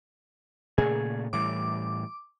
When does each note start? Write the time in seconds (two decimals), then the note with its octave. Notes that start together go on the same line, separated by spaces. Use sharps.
0.78 A#2 C#3 A3 G#4
1.33 A2 E3 G3 D6